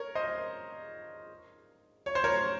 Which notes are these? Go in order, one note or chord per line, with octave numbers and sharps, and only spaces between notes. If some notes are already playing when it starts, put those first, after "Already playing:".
Already playing: A#4 C#5
C5 D#5
C#5
C5
A#4 C#5